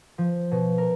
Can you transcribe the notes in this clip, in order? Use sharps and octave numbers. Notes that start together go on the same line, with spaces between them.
F3
B2
A#4